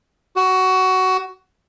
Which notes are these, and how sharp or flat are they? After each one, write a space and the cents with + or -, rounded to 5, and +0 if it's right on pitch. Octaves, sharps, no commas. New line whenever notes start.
F#4 +15